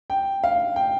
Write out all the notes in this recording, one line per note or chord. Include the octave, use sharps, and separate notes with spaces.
G5
F5
G5